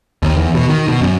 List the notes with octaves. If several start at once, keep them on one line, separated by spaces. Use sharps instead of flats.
D#2
E2
B2
D#3
B2
F#2